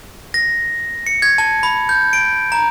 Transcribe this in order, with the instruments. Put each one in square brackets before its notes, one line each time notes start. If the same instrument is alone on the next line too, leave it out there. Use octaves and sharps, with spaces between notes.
[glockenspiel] A#6
C#7
G#6
A5
B5
G6
D7
A#5